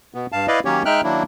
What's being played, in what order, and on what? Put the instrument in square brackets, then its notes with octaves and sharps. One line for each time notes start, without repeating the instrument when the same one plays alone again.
[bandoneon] B2 B3
G2 F5 A5
E4 B4 D5 D#5 F5
D#3 F#3 A#3 C#4 G4 C#5
G#3 D#4 E5 G5 F6 F#6
D#3 F#3 A#3 D4 E4